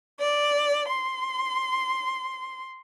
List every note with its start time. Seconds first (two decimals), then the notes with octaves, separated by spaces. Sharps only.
0.21 D5
0.90 C6